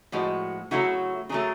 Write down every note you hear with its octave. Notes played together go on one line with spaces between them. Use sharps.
A2 F3 G#3 F#4
C#3 F#3 A3 E4 F#4
C#3 F#3 A3 G#4 A#4